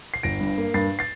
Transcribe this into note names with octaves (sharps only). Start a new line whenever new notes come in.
C7
G1 A#6 D7
G2
A#3
G2 A6 C7
A6 C7